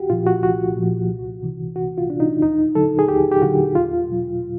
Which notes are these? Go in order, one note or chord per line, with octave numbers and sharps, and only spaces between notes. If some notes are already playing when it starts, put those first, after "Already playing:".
Already playing: C2 F#4 G4
A#2 F3 F4
F#4
C2 F#4
A#2 F3
C2
C3 E3
C2 F#4
F4
C3 E3 D4
D#4
D#2 D#4
D3 F#3 A4
G#4
D#2 G4
G4
D3 F#3 F#4
E2 F4
B2 F#3